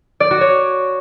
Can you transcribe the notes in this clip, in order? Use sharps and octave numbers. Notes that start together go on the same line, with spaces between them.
D5
F#4
C#5